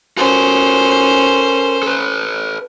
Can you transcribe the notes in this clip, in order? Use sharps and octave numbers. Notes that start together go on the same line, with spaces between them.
C#4 F#4 A4 A#4 C5
A4 B4